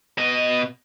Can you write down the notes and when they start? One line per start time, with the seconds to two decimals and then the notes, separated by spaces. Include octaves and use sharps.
0.18 B2 D#5